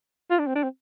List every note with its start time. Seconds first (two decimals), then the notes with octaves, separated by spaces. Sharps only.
0.31 F4
0.39 D4
0.47 C4
0.56 D4
0.64 C4